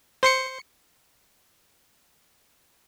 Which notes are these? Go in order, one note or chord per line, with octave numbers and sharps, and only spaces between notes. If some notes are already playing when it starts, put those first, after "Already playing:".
C5 C6 C#7